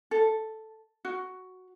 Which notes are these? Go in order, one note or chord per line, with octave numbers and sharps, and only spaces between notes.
A4
F#4